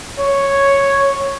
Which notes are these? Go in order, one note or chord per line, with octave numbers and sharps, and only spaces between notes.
C#5